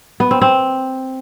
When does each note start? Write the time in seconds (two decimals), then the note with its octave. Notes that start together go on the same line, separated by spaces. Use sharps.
0.20 B3
0.31 C4
0.42 C4